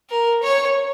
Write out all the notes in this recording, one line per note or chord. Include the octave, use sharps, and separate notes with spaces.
A#4
C#5